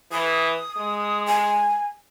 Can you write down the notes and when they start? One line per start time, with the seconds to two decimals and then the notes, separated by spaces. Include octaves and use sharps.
0.12 E3 D#6
0.77 G#3
1.26 G#5